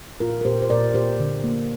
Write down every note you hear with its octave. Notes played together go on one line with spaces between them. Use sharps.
A#2 F4 A#4
A#4
A#2 G4 C5
C5
A#2 A#4 D5
A#2 G4 C5
D3
A#3